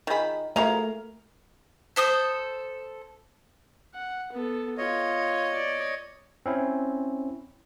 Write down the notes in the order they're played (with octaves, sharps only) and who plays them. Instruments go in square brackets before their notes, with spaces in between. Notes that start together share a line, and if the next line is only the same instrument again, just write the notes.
[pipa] D#3 B5 [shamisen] F4 G#4
[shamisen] F3 F#3 E4 [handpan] A3 A#4 [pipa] G#4 F5 A#5
[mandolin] A4 C5 D#6 G6
[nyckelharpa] F#5
B3 A4
[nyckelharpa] F4 [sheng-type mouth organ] C#5 D#5
[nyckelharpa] D5
[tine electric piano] C4 C#4 E4